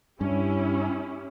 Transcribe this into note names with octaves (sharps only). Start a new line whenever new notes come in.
G2 C#4 E4 G4